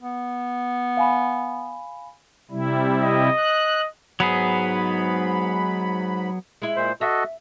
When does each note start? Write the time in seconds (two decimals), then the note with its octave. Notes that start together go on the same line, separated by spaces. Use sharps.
0.02 B3
0.97 F5 G#5 B5
2.51 C3 G3 E4
3.01 D#5
3.37 F#6
4.20 G#2 F#3 B3 G#4 B5
6.62 G#3 E4
6.77 A#2 C5
7.01 F#4 A4 D#5 E5